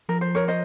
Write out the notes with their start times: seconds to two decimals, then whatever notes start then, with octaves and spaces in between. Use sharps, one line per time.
0.09 F3 A#4
0.21 C5
0.35 A#4 C#5
0.48 C5 D#5